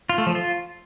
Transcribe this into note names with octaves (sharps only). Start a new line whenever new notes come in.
F4
A3
F3
F4